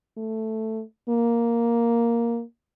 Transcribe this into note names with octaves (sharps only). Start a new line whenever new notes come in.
A3
A#3